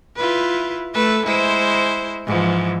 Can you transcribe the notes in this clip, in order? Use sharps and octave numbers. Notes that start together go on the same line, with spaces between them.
E4 F4 B4
A3 A4 B4
G#3 E4 C5
G#2 E3 F3